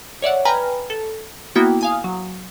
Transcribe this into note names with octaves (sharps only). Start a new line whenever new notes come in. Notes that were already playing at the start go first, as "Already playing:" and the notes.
C#5 D5 E5 F#5
B4 G5 G#5 A#5 B5 F6
A4
A#3 B3 E4 F#4 G5
F5 G#5 D#6
F#3